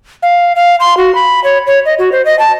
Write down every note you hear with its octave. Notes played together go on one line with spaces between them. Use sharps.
F5
F5
C6
F#4
B5
C#5
C#5
D#5
F#4
C5
D#5
A5